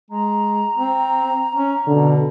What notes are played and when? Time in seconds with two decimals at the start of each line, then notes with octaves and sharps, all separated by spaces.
0.11 G#3 A#5
0.77 C4
1.55 C#4
1.87 B2 D3